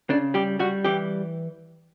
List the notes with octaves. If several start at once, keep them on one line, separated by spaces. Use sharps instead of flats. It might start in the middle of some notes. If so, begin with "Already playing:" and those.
C#3 D4
G3 G4
G3 F#4
E3 G4